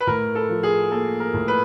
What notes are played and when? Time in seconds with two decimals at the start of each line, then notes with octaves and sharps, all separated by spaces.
0.01 B4
0.07 A2 A#4
0.35 A4
0.49 F3
0.63 G#4
0.92 A#3 A4
1.20 A#4
1.34 A2
1.48 B4